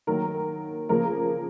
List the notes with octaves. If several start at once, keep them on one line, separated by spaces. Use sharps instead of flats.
D#3 F#3 A#3 A#4
C#3 F3 A#3 A#4